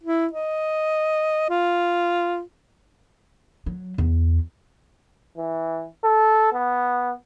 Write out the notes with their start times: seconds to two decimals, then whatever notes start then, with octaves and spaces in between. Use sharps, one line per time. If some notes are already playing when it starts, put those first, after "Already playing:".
0.03 E4
0.33 D#5
1.50 F4
3.66 F#3
3.98 E2
5.37 E3
6.04 A4
6.53 B3